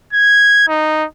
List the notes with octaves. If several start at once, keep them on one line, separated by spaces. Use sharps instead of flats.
G#6
D#4